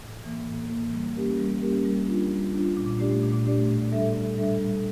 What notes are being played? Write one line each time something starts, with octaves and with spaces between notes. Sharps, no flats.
A2
E3 A#3
A2
E3 A#3
G3
A#3 C#4 G4 A#4
G3
A#3 C#4 G4 A#4
G3
D4 F4
G3
D4 F4
A#2
A3 D4 G4 D5
A#2
A3 D4 G4 D5
A2
G3 D4 A4 E5
A2
G3 D4 A4 E5
G3